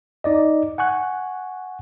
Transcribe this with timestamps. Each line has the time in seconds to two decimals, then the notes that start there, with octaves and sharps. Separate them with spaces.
0.24 D#4 D5 D#5
0.78 F#5 G#5 C#6 F#6